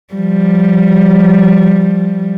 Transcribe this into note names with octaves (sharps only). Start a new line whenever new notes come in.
F3 G3